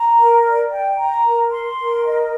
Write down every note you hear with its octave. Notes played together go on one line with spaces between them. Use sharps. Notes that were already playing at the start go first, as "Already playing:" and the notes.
Already playing: A#5
A#4
D5
G5
A#5
A#4
C6
A#4
D#5